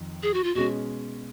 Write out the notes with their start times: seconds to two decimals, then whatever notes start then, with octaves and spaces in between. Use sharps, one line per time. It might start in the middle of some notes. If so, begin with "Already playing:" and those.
Already playing: F2 D#3
0.23 G#4
0.34 F#4
0.44 F4
0.55 B2 G#3 C#4 F#4